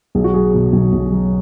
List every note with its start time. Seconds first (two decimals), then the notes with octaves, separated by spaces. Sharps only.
0.15 B1 G#4
0.24 F#4
0.34 F#3 G#4
0.54 B2
0.73 B1
0.93 B1
1.12 F#3